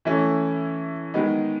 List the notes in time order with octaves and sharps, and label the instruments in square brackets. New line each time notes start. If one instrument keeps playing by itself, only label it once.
[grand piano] E3 A3 C#4 E4
D#3 G#3 B3 D#4